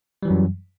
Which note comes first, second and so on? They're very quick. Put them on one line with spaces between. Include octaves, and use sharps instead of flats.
G3 E3 F#3 F#2